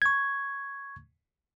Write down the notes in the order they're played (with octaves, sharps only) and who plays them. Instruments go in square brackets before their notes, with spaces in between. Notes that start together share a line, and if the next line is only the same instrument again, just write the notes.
[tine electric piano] C#6 G#6